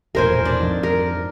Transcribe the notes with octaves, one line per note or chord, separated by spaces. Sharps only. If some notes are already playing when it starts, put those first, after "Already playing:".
E1 A#1 A2 A#4 C5 G#5
D4
F2 G#2
A#4